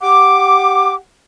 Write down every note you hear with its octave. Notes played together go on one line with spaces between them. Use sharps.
G4 F#5 D6